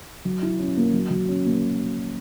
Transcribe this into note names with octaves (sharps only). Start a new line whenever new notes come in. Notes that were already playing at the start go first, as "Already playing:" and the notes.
F#3
E4
C#4
A#3
F#3
F#3
C#4
A#3